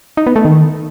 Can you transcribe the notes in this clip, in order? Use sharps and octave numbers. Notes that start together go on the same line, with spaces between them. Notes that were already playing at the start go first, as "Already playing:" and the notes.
D#4
B3
A3
D#3